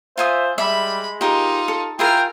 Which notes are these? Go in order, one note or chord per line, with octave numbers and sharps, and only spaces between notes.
F4 C5 E5 G#5 D#6
G3 G#3 E5 B5
D#4 F4 G4 A#4
A4
E4 F4 G#4 A#4 G5 A#5 F6